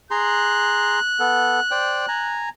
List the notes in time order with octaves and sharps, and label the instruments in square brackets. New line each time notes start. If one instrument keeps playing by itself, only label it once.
[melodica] G#4 A#5 C6 [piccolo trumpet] F#6
[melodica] B3 A4
C5 D5 G5
G#5 A#5